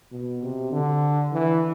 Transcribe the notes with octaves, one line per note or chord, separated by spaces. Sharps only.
B2
C3
D3
E3